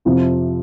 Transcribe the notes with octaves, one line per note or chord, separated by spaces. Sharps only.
F2 C3 F3 C4 E4